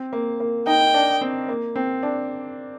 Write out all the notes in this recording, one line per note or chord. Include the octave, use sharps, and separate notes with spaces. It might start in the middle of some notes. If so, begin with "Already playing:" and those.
Already playing: C4
A#3
A#3
D#4 G5
D4
C4
A#3
C4
D4